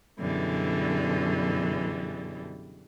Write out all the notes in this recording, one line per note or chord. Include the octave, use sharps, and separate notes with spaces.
F#2 B2 D3 E3 G3 G#3